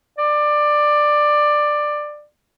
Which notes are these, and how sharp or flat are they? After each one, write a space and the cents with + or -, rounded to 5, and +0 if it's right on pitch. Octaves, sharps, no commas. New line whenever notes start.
D5 +15